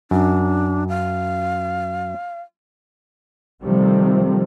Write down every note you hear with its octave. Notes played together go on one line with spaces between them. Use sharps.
F#2 D4
F5
C3 D#3 F3 G3 A3 C4